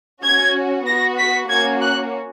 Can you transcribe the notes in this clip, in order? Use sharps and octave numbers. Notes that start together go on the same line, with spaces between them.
C#4 F#4 G#6
B3 F#4 A#6
B6
A#3 C#4 F#4 G#6
F#6